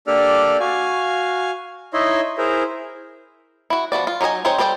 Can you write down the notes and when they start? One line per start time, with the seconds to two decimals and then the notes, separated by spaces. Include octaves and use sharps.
0.07 A#3 D4 G4 A4 D5 F6
0.60 F#4 F5 G#5
1.93 D#4 E4 C#5 D#5 E5 C6
2.38 E4 G#4 A#4 C5
3.70 E4 F#4
3.92 F3 B3 F#4 D5
4.07 F4
4.21 F#3 D#4 G#4 D#5 G#5
4.45 C4 D#4 G#4 C5 C#5
4.58 G3 A4 C5 D5 G5